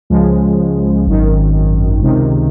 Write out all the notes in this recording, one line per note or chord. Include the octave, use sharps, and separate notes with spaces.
C#2 C#3 F3 G#3
G#1 F#2 D#3
C#2 C3 D#3